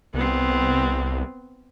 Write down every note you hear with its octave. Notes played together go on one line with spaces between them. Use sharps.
C2 B3 C4